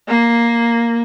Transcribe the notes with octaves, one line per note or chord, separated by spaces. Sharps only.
A#3